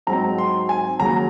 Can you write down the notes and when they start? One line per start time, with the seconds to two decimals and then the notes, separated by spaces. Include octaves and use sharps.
0.07 G#2 F#3 C4 D#4 A#5
0.38 C6
0.69 G#5
1.00 D#2 C#3 F#3 A#5